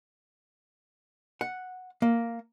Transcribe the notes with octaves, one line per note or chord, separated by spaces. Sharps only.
F#5
A#3